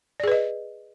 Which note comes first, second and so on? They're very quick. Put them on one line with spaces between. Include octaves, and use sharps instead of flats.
D5 G#4 B4 D#5